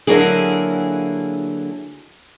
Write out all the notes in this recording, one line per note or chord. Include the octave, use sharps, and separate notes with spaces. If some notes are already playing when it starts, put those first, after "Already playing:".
D3 F#3 A#3 E4 G#4